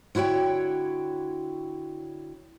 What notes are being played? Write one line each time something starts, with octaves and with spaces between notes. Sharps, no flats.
D3 E4 F#4 C#5 G5